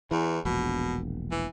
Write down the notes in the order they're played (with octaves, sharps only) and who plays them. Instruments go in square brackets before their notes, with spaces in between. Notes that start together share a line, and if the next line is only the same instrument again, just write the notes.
[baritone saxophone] E2 [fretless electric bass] E3
[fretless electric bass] E1 A#1 [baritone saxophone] B2
[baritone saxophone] E3